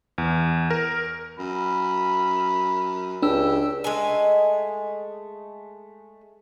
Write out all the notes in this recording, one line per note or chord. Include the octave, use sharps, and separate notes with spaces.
E2
A#4
F#2 B5
C#2 D4 G4 E6
G#3 A3 D#5 G#5